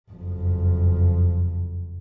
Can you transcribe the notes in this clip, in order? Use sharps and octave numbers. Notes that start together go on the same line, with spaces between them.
F#1 F2